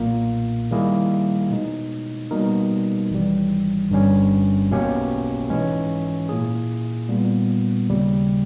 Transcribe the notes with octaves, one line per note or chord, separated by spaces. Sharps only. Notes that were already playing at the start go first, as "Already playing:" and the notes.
Already playing: B1 A#2 A#3
D#3 G3 A#3 E4 G#4
B2 G#3 D#4
B2 G3 A#3 D#4 A#4
G#1 G#2 E3 G3
G1 G2 G3 C#4
B1 B2 A#3 C#4 G4
G#2 E3 G#3 C#4
A#2 A#3 E4 G#4
A#2 G3 B3
D#2 C#3 G3